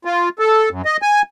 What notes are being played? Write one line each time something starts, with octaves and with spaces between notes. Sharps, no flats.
F4
A4
F#2
D#5
G#5